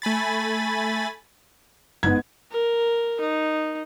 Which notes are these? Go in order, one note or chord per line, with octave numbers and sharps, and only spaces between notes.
A3 G#5 B5 A6
G1 G#2 B3 G#6
A#4
D#4